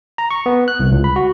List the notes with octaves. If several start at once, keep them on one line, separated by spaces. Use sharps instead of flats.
A#5
C#6
B3
F#6
C2
C#2
B5
F#4